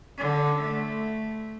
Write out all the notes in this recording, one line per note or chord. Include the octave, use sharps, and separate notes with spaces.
D3
A3